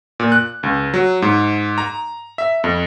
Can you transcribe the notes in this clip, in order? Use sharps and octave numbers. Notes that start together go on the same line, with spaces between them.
A#2
F#6
C#2
F#3
G#2
A#5
E5
F2